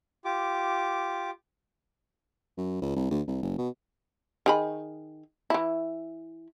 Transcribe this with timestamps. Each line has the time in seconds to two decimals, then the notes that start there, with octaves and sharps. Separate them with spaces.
0.25 F4 G4 D6
2.57 F#2
2.82 C#2
2.96 C2
3.11 D2
3.27 C2
3.42 F#1
3.58 B2
4.46 D#3 G#4 B5
5.50 E3 E4